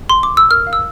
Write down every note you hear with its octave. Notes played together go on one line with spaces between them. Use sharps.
C6
D6
E6
A#4 F6
F5
E6